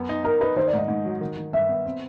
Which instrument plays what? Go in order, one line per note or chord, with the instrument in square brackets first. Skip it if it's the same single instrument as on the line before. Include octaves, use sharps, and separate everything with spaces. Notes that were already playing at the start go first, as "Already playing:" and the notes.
Already playing: [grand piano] F#2 B3
D#4
[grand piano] D#4 [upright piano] A#4
[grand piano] D#4 [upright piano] B4
[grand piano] D#3 [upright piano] C5
[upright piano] D5
[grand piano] G#2 [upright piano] D#5
[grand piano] G#2
F#3
D#3
D#3
[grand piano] G2 [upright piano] E5
[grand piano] B3
C4